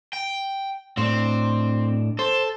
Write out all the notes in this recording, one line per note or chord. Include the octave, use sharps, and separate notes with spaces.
G5
A2 C4 D4
A4 C5